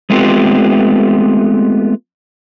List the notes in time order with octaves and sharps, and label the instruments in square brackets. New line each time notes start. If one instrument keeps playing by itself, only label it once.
[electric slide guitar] G#3 A3 B3 C4 F4 G4